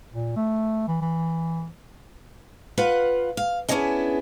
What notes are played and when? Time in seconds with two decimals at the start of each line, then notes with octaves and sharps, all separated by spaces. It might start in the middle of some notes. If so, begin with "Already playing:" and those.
0.12 A#2
0.36 A3
0.88 E3
1.01 E3
2.78 F4 B4 F5 F#5
3.37 F5
3.69 B3 C#4 D4 E4 G#4 D#5